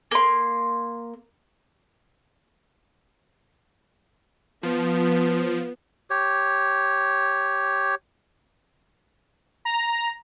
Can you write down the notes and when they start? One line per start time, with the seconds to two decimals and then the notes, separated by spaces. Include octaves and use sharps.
0.11 A#3 C6
4.63 F3 B3
6.10 G4 C#5
9.65 A#5